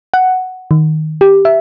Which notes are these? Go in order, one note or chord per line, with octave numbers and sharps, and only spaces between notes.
F#5
D#3
G4
E5